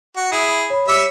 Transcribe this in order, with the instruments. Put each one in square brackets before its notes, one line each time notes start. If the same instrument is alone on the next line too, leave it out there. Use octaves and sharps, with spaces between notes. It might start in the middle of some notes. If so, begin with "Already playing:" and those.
[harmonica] F#4
[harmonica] E4 G#4 [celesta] D#6
[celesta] C#5 B5
[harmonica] G3 E5 E6 [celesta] C#5 D6 C#7